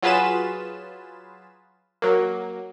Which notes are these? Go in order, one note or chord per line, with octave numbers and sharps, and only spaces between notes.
F#3 F4 G#4 B4 A6 E7
F#3 A#3